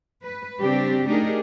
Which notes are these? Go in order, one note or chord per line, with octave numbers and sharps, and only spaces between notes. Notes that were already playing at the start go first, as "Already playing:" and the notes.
B4
C#3 G3 C4 D4 G4
A3 D4 D#4 G4 G#4 A#4